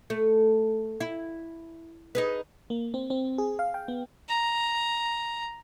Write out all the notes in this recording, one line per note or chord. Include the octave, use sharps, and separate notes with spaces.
A3
E4
D#4 G#4 B4
A#3
C4
C4
G#4
F5
G5
B3
A#5